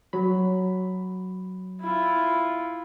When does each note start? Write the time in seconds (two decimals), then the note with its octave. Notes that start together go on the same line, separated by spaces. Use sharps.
0.13 F#3 B5
1.81 E4 F4